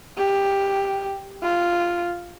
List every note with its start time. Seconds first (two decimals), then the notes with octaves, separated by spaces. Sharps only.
0.18 G4
1.43 F4